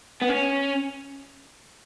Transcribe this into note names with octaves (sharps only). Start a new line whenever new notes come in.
B3
C#4